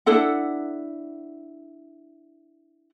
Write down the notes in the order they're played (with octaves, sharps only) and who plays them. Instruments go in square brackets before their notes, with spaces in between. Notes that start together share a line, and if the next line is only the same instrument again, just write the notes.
[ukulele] D4 E4 A4 F#5